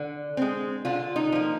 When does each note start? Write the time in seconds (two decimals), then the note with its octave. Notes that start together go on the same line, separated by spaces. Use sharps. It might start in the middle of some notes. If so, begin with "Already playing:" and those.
Already playing: D3
0.37 G#3 C4
0.85 D3 F4
1.16 D#4
1.32 F3 A#3